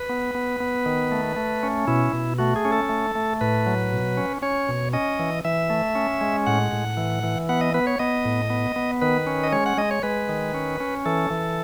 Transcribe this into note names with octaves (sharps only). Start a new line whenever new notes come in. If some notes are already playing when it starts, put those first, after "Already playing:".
Already playing: B4
B3
B3
B3
D#3
A3
A3
C#4
B2 E4
B2
A3 F#4
G#4
C#4
A4
A3
A3
A2 B4
F#3
B2
C#4
C#4 C#5
B2
C#4 D#5
E3
E3 E5
A3
C#4
G#3
A2 F#5
A2
E3
E3
B3 F#5
D#5
B3 B4
C#5
B3 D#5
A2
B3
B3
D#3 B4
C#4
D#5
G#3 C#5
F#5
G#3 D#5
C#5
G#3 B4
D#3
C#4
C#4
E3 A4
E3